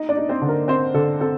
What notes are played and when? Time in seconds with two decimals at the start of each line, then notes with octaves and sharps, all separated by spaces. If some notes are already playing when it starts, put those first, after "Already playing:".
Already playing: D#4 D#5
0.09 D4 D5
0.17 D#4
0.29 C4 C5
0.42 D3
0.49 A#4
0.68 C4 C5
0.94 D3 A4
1.20 C4 A4